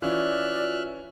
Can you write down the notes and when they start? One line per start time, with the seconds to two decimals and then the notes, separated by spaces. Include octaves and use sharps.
0.02 E3 C#4 F4 F#4 D5 E5 F6 F#6